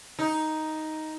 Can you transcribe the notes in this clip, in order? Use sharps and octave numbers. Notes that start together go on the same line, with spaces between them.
D#4